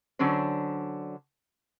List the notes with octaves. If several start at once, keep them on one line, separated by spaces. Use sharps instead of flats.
D3 F#3 C#4 D4 C5